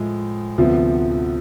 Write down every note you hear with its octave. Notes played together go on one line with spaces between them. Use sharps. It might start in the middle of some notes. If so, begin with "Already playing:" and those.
Already playing: A2 F3 G#3
D2 C3 F3 B3